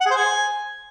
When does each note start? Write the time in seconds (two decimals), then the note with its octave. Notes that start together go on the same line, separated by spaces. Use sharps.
0.01 F#5
0.06 G#4
0.11 C5
0.16 G#5